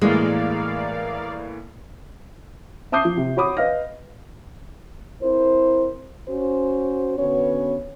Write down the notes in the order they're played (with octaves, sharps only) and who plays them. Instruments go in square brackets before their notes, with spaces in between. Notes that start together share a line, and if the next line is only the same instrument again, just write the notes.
[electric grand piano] A2 E3 A#3 [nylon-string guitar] G#3 [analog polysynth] A#4 D5 F5
[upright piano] E5 A5 D6 D#6 G6 C7
F3
C3
F#4 C#5 B5 D6 D#6
B4 D#5 F5 F6 A#6
[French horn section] C4 E4 A#4 C5
C#4 F#4 C5
D3 B3 C#4 F#4 B4 C#5